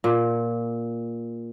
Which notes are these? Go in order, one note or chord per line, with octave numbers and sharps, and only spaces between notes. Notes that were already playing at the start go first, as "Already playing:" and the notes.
A#2